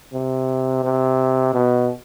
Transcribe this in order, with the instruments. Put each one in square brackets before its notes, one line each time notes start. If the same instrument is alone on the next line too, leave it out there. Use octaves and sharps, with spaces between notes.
[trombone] C3
C3
B2